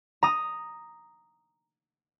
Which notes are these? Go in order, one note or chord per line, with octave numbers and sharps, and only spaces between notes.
A#5 D#6